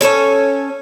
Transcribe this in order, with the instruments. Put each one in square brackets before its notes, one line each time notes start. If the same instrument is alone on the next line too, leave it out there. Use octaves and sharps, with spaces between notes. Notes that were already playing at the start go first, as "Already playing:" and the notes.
[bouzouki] C#4 A4 A#4 C#5